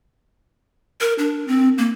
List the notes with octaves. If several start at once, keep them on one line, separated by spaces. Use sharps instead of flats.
A#4
D4
C4
A#3